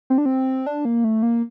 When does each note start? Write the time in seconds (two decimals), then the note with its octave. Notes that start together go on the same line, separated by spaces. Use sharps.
0.10 C4
0.18 D4
0.26 C4
0.66 D4
0.85 A#3
1.04 A3
1.23 A#3